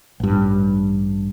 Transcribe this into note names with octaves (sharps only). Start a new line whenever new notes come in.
A1 G2